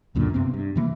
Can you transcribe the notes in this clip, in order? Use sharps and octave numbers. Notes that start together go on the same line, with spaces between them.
C#2 F#2 A#2 D3
G2 C3 B3 C4
G2
C3 E3 A#3